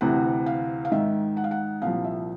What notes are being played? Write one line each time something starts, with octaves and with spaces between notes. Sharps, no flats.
D2 C3 E3 F#5
F5
F5
G#2 D#3 E5
F#5
F5
F#5
C2 A#2 F3 F5
E5